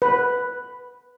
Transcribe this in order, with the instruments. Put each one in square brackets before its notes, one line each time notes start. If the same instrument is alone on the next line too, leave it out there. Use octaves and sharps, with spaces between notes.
[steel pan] B4